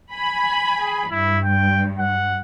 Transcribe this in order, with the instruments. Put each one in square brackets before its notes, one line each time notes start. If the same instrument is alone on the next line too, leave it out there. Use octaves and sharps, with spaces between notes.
[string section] G#5 B5
[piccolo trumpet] G#4
[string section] G2 [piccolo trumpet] E4
[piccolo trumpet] G5
F#5